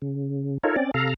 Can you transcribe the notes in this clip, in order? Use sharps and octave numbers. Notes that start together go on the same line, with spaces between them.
C#3
D#4 F4 A4 A#4 C#5
C4 C#4 D5
C3 A4 F5 A#5